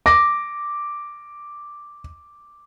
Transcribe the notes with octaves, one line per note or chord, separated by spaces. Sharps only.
D6 A#6